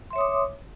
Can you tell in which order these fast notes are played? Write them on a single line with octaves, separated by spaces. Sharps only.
C6 E5 C#5 D#6 D6